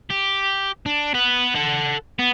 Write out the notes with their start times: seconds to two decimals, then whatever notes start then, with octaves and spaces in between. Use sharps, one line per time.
0.10 G4
0.86 D4
1.14 B3 B4
1.55 A4 F#5
2.19 B3